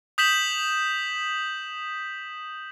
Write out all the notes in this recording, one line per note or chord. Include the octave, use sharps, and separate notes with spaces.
D#6 G6 B6 E7 F#7